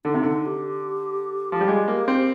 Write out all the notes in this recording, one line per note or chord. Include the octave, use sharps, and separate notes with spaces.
D3 D#4
C3
D3
G4
F3
G3
G#3
A#3
C4